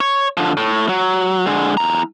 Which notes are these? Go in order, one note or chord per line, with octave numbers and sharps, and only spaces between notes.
C#5
D3 F3
A2
F#3
D3 G#3
E2 A#5